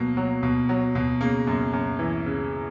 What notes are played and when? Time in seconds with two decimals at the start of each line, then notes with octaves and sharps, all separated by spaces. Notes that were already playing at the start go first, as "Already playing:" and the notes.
Already playing: B2 F#3 A#3
0.17 F#3
0.43 B2
0.69 F#3
0.95 B2
1.21 C#3 A#3
1.47 F#2
1.73 F#2
1.99 E3
2.26 C#3